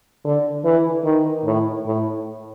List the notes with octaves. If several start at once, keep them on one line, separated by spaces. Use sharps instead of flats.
D3
E3
D#3
A2
A2